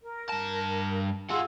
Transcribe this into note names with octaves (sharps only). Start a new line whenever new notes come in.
A#4
G2 A5
F4 G#4 F#5 C6 E6